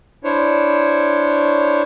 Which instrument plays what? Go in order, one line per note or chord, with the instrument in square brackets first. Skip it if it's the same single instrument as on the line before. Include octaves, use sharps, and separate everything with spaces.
[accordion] D4 E4 C5 C#5